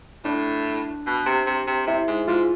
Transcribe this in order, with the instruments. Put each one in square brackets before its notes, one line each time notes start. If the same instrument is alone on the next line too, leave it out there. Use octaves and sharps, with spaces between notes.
[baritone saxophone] A2 [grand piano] D4
[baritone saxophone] B2
C3
C3
C3
[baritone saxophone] C3 [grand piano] E4
[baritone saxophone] G#2
[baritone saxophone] G#2 [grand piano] F4